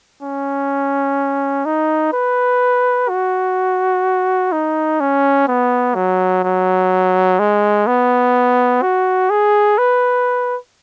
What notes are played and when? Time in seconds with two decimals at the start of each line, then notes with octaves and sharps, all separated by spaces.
0.22 C#4
1.65 D#4
2.12 B4
3.09 F#4
4.52 D#4
5.00 C#4
5.47 B3
5.95 F#3
6.43 F#3
7.39 G#3
7.87 B3
8.82 F#4
9.30 G#4
9.78 B4